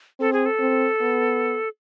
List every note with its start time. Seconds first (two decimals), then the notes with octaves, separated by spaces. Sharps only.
0.20 C4 A4
0.33 G#4
0.46 A4
0.60 C4
1.01 B3